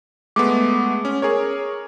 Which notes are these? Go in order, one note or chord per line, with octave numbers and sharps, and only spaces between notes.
G#3 A3 B3 D6
C#4
G#4 A#4 C#5